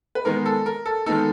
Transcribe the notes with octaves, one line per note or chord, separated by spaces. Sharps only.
B4
D#3 G#3 B3 D#4 A#4
A4
A#4
A4
D#3 G#3 B3 D#4 A4